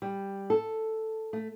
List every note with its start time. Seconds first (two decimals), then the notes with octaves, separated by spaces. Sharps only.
0.02 G3
0.50 A4
1.33 A3